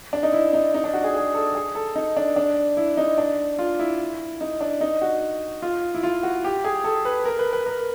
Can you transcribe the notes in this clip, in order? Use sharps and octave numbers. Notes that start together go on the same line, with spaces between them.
D4
D#4
E4
D#4
D#4
D4
F#4
G#4
G#4
A4
G#4
A4
D#4
D4
D4
E4
D#4
D4
F4
E4
D#4
D4
D#4
F#4
F4
E4
F4
F#4
G4
G#4
A4
B4
A#4
B4
B4
A#4